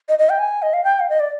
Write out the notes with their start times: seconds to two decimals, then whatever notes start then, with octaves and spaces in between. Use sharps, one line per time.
0.09 D#5
0.19 D#5
0.30 G5
0.39 G#5
0.62 D#5
0.73 F5
0.84 G5
1.00 F5
1.09 D#5
1.20 D5